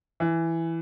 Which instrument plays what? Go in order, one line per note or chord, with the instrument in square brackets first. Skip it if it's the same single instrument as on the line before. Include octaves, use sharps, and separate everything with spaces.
[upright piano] E3